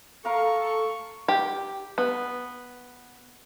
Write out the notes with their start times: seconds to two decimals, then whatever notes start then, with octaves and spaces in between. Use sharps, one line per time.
0.25 A4 A#4 F5 A#5 C#6
1.28 G4
1.98 B3